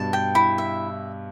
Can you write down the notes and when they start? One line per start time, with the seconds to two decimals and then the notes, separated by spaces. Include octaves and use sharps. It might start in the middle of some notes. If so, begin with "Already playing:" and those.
Already playing: G2 B2 A5
0.13 G5
0.35 E4
0.58 E5